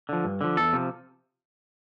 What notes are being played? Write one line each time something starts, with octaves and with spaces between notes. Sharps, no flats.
D3 F3
G2
D3 F3
E2 A4
C3 F3